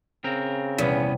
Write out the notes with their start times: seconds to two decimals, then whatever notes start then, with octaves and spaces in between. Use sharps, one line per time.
0.24 C#3 C4 A#4
0.78 A#1 E2 C3 G3 B3 C#4